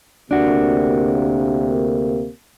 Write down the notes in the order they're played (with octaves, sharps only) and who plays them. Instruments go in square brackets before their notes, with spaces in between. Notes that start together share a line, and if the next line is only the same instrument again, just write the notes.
[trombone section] D2 C3 A#3 [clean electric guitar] D4 F#4